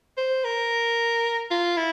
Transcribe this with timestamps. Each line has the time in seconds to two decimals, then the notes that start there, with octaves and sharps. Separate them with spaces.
0.17 C5
0.44 A#4
1.51 F4
1.77 E4